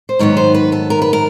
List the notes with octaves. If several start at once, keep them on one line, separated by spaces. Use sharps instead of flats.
C5
G#2 D#3 F#3 B3 C#5
C5
B4
A4
A#4
B4
A#4